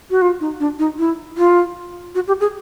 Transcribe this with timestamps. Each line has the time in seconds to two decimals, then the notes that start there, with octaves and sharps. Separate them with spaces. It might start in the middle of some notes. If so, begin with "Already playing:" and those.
0.11 F#4
0.22 F4
0.40 D#4
0.60 D4
0.79 D#4
0.98 E4
1.37 F4
2.15 F#4
2.28 G4
2.41 G#4